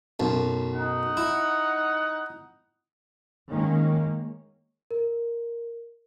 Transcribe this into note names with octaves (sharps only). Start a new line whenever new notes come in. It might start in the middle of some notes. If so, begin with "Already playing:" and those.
B1 F#2
D#4 F#5
E4
D#3 G#3 A#3 C#4
A#4